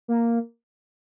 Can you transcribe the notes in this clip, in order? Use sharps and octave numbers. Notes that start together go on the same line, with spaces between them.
A#3